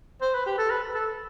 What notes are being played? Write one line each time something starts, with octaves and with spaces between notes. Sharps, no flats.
C5
B4
G4
A4
B4
A4